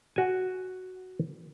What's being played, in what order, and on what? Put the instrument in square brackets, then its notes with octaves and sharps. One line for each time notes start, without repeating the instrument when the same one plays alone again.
[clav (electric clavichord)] F#4 G#5